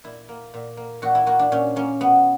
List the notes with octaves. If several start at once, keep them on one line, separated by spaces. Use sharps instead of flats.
A#2 E4
A#3
A#2
A#3
A#2 F#4
E4
A#3 F#4
D4
A#2 C#4
A#3 C#4
B2 B3